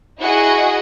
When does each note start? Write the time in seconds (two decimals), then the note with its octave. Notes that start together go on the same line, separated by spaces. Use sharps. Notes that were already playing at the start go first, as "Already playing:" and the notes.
0.20 E4 F#4 G#4 D#5 F#5